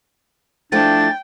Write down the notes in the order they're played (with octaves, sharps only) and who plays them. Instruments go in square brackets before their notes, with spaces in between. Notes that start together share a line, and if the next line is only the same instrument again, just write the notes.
[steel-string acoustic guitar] F3 A3 E4 [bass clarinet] D4 [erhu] G5 [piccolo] A6